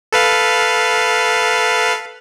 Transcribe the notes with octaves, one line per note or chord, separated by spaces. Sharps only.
A4 B4 F5